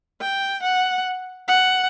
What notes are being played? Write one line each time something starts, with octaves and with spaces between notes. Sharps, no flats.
G5
F#5
F#5